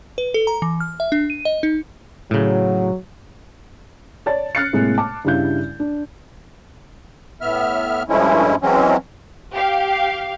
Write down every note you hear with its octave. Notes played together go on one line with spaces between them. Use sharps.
B4
A4
A#5
E3
F6
E5
D4
D#7
D#5
D#4
A2 C#3 F#3
C#5 D5 A5 A6
F6 F#6 A6 C7 C#7
A2 C3 G#3 A#3
A5 D6
G2 C#3 G3 E4 F5 G6
D4
A2 B3 E5 F6
G2 F3 G#3 A3 C#4 E4
E3 F#3 G#3 C4 C#4
G4 F5